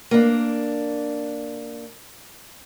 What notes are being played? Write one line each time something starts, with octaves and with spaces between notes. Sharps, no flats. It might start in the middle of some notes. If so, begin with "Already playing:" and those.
A#3 D4